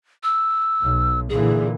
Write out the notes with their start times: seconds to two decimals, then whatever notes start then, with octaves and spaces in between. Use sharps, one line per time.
0.23 E6
0.83 B1
1.30 A#2 D3 E3 G#4